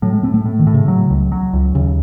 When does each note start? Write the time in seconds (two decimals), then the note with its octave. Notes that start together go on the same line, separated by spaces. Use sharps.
0.02 A2 F#3
0.12 G#3
0.23 A2 C4
0.34 A3
0.45 A2
0.59 D#3
0.67 A2
0.74 C#3
0.88 F#3
1.10 C#2
1.32 F#3
1.53 C#2
1.75 D#2 C#3